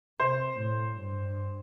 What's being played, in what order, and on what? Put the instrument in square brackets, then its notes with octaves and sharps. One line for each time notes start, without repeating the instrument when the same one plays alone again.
[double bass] C3 [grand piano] C5
[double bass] A2
G2